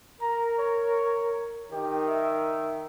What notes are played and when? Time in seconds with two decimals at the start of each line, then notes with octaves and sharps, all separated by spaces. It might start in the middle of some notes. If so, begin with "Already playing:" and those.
0.21 A#4 A#5
0.59 C#5
1.71 D#3 G4
2.07 E5